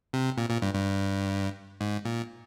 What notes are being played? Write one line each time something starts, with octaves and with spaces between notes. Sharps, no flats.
C3
A#2
A#2
G2
G2
G#2
A#2